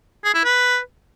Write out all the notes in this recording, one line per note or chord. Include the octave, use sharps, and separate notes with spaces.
G#4
E4
B4